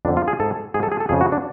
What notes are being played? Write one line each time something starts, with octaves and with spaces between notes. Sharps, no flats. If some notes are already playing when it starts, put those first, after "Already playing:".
F2 D3 D4
F4
G#4
G#2 A4
G#2 G#4
A4
G#4
A4
F2 C#3 G#4
F#4
D4